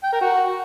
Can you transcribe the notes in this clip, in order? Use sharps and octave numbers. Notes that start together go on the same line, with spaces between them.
G5
A#4
F#4